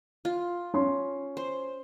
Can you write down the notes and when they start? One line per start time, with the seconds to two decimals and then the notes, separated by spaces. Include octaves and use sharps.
0.25 F4
0.74 C#4 C6
1.37 C5